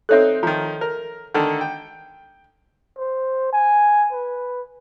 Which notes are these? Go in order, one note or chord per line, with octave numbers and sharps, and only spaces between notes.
C4 D#4 A4 C#5 E5 F#6
D#3 F3 A#5
A#4
D3 D#3 A4
G5
C5
G#5
B4